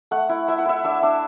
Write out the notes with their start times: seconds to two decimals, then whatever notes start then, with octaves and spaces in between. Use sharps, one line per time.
0.11 A3 F#5
0.29 E4
0.48 E4 E5
0.58 F#5
0.65 E4 E5
0.84 D4 E5
1.03 D4